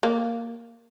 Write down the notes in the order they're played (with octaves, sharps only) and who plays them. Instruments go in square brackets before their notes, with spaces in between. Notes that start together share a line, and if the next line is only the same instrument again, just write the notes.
[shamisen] A#3